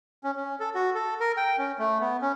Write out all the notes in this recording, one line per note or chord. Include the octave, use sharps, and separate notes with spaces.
C#4
C#4
A4
F#4
A4
A#4
G5
C#4
A3
B3
C#4